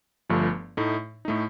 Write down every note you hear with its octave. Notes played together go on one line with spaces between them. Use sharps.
G1 G2 F3 A3
A2 A3 D#4
A2 A3 D#4